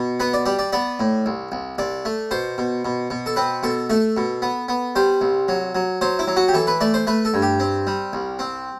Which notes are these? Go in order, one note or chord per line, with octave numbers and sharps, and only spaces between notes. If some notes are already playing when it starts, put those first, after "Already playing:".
Already playing: B2
B3 B4
D5
G3 D5
D5
B3 D5
A2
C2
C2
C2 D5
A3
B2 C5
B2
B2
B2
A4
C4 B4
B2 A4
A3 A4
B2
B3
B3
G3 C5
C2
F#3
F#3
F#3 C5
E4
F#3
F#4
G4
E3 A4
B4
A3 D5
C5
A3 B4
A4
G2
G4
C4
G3
C2
C4